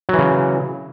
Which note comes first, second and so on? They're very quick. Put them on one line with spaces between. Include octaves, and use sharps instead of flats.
F#3 E3 C#3